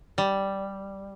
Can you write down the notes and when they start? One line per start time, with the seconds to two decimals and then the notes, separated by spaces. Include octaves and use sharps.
0.18 G3